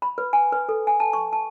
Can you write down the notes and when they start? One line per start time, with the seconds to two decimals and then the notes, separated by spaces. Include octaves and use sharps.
0.02 B5
0.18 B4
0.33 G#5
0.52 B4
0.69 A4
0.87 G#5
1.00 A5
1.13 C#6
1.33 A5